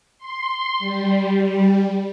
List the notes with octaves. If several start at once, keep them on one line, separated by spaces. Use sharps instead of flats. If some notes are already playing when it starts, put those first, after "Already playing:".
C6
G3